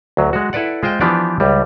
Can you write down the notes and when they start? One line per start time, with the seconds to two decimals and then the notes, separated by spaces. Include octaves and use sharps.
0.17 D2 F#3
0.33 G#3 F#4
0.53 E4 A4 B4 D5 F#5
0.83 G#3 F4 C5 D#5 G5
1.01 E3 F3 B3 D4 G4 D5
1.40 C#2 G3